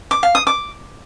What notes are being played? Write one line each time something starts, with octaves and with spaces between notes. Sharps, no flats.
D6
F5
D#6
D6